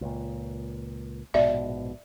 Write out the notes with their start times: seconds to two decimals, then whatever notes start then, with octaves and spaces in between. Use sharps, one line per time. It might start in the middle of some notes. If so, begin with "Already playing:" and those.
0.01 C#2 A#2
1.34 A#1 G#2 B2 D5 E5